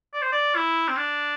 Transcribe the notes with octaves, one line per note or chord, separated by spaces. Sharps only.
D5
C5
D5
E4
C4
D4